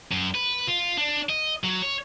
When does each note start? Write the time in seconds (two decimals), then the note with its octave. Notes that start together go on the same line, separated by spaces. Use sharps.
0.12 F#2
0.35 B4
0.67 F4
0.97 D4
1.29 D#5
1.64 F#3
1.82 C#5